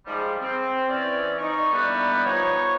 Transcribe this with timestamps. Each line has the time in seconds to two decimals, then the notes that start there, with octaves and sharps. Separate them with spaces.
0.07 G#2 F3 G3
0.41 C4
0.90 E3 C4 C#4 D5
1.39 D#4 C#6
1.72 D3 E3 G3 A#3 B3
2.25 F3 B3 D#4 G4 B4 C#5